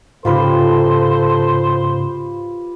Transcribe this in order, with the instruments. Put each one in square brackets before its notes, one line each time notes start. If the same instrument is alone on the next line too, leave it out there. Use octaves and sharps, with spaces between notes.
[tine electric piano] G#2 C#3 [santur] F4 G4 B4 [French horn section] A4 [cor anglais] C5